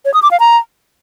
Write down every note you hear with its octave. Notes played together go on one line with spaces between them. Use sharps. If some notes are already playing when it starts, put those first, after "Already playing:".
C#5
D#6
D6
F5
A#5